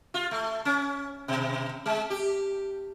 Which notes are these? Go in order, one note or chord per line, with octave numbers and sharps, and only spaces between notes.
F4
A3
C#4
B2
G#3
G4